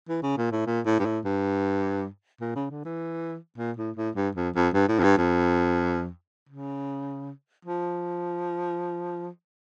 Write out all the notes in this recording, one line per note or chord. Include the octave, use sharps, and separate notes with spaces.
E3
C#3
A#2
A2
A#2
A2
G2
A2
G2
A#2
C#3
D3
E3
A#2
A2
A2
G2
F2
F2
G2
A2
F2
G2
F2
C#3
F3